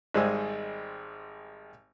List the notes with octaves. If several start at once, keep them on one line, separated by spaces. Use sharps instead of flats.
G#1 G3 G#3 C5 G#5 E6